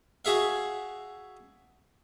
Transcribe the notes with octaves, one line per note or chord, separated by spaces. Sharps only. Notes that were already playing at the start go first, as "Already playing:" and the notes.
F#4 G#4 E5 F5